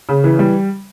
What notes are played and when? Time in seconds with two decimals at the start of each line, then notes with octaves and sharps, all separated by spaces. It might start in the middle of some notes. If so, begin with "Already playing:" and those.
0.09 C#3
0.24 E3
0.39 G3